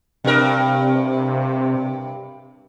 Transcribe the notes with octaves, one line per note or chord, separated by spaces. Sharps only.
G2 C3 A#4